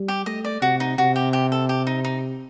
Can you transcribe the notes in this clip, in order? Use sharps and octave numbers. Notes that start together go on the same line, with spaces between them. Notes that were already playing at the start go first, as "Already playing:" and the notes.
Already playing: G3
G4
A3 D#5
D5
C3 F#4
D#4
C3 F#4
G4
G4
A4
G4
D#4
D#4